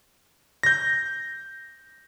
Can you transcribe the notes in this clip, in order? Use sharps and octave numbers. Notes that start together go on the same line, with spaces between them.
G6 A#6